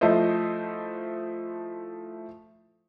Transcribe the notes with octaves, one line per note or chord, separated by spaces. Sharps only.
F3 A3 E4 C5 D#5